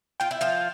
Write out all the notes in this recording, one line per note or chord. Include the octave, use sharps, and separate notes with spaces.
F4 G5
E4
F3 F4